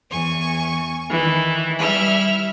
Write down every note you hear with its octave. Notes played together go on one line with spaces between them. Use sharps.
E2 G#5 C#6
D#3 E3
G3 E4 E5 F6